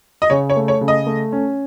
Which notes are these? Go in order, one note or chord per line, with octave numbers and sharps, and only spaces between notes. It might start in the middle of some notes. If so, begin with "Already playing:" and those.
D#5
C#3 C#5
C#5
A3
C#5
C#3
D#5
A3
C#4